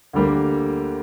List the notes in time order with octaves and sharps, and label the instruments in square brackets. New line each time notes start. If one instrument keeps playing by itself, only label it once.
[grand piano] D2 D3 G3 A#3